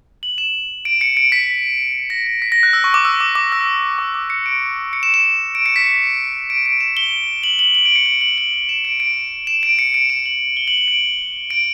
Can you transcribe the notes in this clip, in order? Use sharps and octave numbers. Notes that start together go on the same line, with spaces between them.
F#7
E7
D7
C#7
D7
B6
A#6
A#6
B6
A#6
F#6
E6
C#6
D6
E6
D6
D6
E6
D6
D6
C#7
D7
C#7
E7
E7
D7
C#7
B6
C#7
D7
D7
E7
G7
F#7
F#7
F#7
D7
C#7
D7
F#7
F#7
F#7
E7
D7
D7
E7
D7
C#7
D7
E7
F#7
G7
F#7
F#7
D7
D7